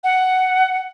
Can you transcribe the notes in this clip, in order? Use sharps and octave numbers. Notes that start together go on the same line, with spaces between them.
F#5